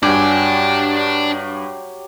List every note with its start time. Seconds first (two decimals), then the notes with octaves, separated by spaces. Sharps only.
0.03 G2 F#3 D4 G4 D5 G#5 D6 G6